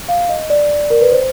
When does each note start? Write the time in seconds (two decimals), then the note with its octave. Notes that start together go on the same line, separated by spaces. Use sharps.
0.08 F5
0.29 D#5
0.50 D5
0.90 A#4
1.01 B4
1.12 C5